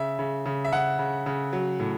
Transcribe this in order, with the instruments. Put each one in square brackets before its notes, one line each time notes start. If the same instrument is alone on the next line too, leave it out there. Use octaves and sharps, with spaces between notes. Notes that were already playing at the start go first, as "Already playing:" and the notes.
Already playing: [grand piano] C#3 E5
C#3
C#3
E5
C#3 F#5
C#3
C#3
F#3
A2